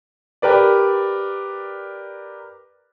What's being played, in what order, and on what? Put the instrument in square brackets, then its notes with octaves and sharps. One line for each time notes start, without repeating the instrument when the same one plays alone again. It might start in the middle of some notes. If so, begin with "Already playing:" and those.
[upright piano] G4 A#4 B4 D5